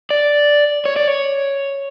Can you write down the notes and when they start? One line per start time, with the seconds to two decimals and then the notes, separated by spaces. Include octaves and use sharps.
0.10 D5
0.85 C#5
0.96 D5
1.08 C#5